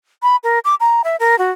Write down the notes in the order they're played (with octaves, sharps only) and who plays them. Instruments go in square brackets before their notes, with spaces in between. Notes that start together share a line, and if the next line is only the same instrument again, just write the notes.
[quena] B5
A#4
D6
A#5
E5
A#4
F#4